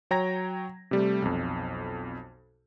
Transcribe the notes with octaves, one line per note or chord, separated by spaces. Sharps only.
F#3 C#5 G5 A#5 G#6 A#6
C3 G3 A3
B1 F2